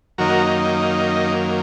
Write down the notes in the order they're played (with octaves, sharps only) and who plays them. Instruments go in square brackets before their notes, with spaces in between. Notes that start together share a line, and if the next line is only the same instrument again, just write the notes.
[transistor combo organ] F#2 D#3 A#3 D#4 F#4 A#4